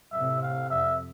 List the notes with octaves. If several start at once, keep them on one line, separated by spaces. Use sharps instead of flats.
A2 C3 E5
F5
F2 E5